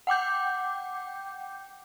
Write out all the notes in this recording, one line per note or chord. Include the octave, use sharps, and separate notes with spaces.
F#5 G5 D6 G6